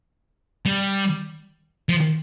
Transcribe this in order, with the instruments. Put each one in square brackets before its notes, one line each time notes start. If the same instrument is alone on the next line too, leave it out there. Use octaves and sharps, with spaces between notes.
[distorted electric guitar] G3
F3